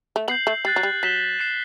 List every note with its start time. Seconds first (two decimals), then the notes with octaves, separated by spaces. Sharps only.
0.16 A3
0.28 B3 G6 C7 F#7
0.47 A3
0.65 G3 F#6 A6 C7
0.76 F#3
0.83 G3
1.02 F#3 F#6 B6 E7 G7
1.39 F#6 C7 E7